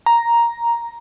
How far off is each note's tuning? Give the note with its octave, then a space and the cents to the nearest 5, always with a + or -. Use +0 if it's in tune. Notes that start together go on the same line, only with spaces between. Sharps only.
A#5 +5